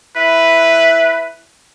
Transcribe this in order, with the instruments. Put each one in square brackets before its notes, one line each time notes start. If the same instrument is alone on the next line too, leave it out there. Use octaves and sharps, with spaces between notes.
[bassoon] E4 [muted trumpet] B4